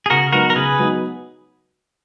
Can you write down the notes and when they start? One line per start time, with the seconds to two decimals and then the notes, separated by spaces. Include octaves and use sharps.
0.06 G#4
0.10 C#3 F#4 A#4
0.32 F#3 B3 D#4 F#4 A#4
0.50 A#4
0.55 C#3 G#4 B4
0.79 F#3 B3 D#4